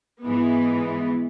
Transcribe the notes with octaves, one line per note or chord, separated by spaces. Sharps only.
G#2 E3 G#3 B3